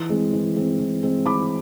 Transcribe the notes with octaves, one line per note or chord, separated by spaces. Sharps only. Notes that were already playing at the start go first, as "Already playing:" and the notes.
Already playing: E3
G#3 C4
E3
G#3 C4
E3
G#3 C4
E3 B5 D6